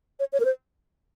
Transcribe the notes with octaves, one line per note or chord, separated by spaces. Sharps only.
C#5
C#5
A#4
C5